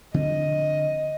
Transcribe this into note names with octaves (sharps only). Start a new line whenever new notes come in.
D3 F3 C4 D#5